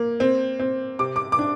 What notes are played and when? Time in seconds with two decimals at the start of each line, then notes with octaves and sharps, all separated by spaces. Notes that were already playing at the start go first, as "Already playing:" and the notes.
Already playing: A#3
0.20 C4
0.59 C4
0.99 C3 D6
1.16 D6
1.32 D6
1.39 D4